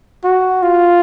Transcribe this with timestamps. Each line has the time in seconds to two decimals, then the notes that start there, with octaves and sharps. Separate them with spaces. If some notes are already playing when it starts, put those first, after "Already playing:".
0.24 F#4
0.62 F4